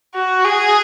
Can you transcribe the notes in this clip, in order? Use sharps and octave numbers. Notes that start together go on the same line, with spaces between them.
F#4
G#4